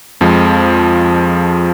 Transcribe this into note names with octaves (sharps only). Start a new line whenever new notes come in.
F2 F3 G#3